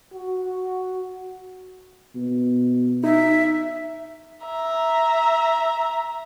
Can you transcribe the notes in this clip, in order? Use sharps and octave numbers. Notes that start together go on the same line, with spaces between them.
F#4
B2
D#4 E5
E5 A#5